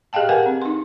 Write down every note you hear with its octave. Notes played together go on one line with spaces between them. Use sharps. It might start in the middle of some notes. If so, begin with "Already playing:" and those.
G4 G#4 D#5 F5 G5 A5
G4 A#4 B4 F#5 G#5
C4
D#4 C6